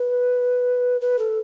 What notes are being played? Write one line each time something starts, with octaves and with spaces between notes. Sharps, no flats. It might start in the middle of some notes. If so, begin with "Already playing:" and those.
Already playing: B4
B4
A4